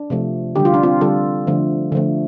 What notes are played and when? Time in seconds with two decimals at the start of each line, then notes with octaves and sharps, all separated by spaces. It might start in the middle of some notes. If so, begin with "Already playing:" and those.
Already playing: D4
0.10 C3 F3 A3
0.56 D3 G3 G4
0.65 F4
0.74 D4
0.83 C4 F4
1.01 D3 G3 F4 A4
1.47 D3 F3 A3
1.92 D3 F3 A3